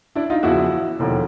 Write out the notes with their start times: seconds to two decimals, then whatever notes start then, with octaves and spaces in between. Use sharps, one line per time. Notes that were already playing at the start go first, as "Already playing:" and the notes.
0.15 D4 E4
0.30 D#4 F4
0.43 E2 C#3 F3 E4 F#4
0.99 E1 D#2 D3 F3